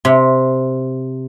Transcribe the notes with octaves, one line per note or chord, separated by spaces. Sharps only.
C3